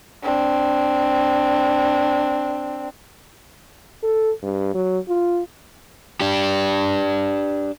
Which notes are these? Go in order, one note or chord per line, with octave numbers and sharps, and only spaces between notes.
C4 D4
A4
G2
F#3
F4
D4 G4